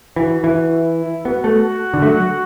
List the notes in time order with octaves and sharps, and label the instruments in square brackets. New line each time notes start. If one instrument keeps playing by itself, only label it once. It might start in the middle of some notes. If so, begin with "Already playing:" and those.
[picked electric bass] E3 [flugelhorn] F#4
[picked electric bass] E3
[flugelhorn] E4
[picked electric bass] B3 [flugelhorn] F#4
[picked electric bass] A3
D3
A3
F#3